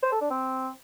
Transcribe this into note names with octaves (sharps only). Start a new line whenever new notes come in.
C5
A4
D4
C4